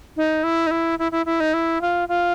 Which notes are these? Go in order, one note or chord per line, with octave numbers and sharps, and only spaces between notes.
D#4
E4
D#4
E4
E4
E4
E4
D#4
E4
F4
F4